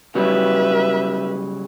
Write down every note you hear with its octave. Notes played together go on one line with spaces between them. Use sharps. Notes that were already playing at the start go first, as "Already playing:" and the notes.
C#3 F#3 G3 B4 E5